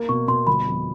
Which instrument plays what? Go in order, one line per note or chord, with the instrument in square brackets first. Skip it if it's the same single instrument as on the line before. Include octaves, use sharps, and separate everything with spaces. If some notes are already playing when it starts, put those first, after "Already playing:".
Already playing: [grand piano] A#3
[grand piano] B2 [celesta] C#6
[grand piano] B2 [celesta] C6
[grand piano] G1 [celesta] B5
[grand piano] F2